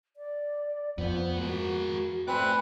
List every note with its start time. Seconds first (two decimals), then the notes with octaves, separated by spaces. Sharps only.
0.17 D5
0.98 F2 B3 B4 C5
1.38 G#3 F#4 A#4
2.28 A3 C4 B4 D5 G#5 F#6